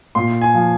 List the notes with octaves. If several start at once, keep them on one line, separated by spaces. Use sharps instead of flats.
A#2 C6
G#5
F3